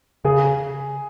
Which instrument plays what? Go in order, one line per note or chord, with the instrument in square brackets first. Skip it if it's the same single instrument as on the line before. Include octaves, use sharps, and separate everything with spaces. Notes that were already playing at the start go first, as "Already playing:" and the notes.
[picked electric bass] C#3 [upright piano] G#4